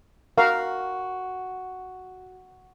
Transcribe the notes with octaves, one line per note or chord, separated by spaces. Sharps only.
F#4 A#4 F5